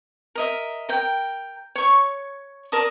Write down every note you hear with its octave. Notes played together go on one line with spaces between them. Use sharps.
A#4 D#5 E5
A#4 G5
C#5 C#6
A#4 D5 A5 D#6